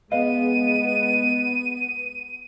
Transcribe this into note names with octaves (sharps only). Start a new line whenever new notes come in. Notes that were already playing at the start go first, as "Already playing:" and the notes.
G#3 B3 B4 D#5 F5 D#7